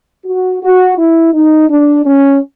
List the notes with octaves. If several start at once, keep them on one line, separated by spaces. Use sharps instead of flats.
F#4
F#4
E4
D#4
D4
C#4